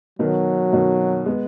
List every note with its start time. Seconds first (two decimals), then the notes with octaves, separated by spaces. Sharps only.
0.19 B2 D#3 F#3
0.72 B2 D#3
1.26 G#3 B3